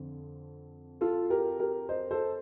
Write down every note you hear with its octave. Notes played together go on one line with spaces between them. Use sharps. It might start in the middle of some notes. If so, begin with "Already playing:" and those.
Already playing: F2 D3 C4
F4 A4
G4 A#4
G4 A#4
C5 D#5
A4 C5